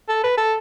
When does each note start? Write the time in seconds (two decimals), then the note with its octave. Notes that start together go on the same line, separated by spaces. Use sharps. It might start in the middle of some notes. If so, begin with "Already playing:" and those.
0.09 A4
0.23 B4
0.38 A4